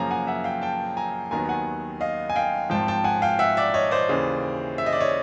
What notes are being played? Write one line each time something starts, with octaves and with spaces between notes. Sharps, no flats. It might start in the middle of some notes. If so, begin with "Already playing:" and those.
Already playing: F#2 C#3 F3 A#3 C#4 G#5 A#5
F#5 G#5
E5 F#5
F5 G5
G5 A5
G#5 A#5
D#2 D#3 F#3 B3 G#5 A#5
F#5 G#5
D#5 F5
G#5
F5 G5
G#1 G#2 F3 G5 A5
G5 A5
F#5 G#5
F5 G5
E5 F#5
D5 E5
C#5 D#5
C5 D5
D#2 C#3 E3
E5
D#5
D5
C#5 D#5